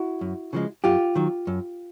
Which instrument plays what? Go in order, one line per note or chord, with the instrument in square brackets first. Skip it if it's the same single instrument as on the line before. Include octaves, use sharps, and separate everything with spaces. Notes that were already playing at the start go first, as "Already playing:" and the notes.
Already playing: [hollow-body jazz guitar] E4 F#4
F#2
C#3 F3 G#3
F#2 F4 G4
D#3 F#3
F#2